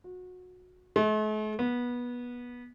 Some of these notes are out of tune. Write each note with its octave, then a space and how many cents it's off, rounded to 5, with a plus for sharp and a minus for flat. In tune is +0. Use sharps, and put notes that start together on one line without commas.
F#4 -25
A3 -45
B3 -20